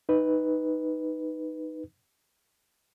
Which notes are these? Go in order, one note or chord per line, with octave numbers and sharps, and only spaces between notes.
D#4 B4